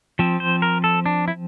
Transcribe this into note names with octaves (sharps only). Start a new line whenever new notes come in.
F3 C4
C5
A#4
A4
D4
E4